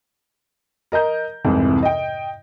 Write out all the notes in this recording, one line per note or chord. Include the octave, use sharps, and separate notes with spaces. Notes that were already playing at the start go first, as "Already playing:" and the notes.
A#4 D#5 A#5 G6
C2 F2 G#2 C3 E3
D#5 G5